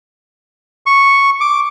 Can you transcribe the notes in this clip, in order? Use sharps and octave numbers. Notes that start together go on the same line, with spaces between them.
C#6
D6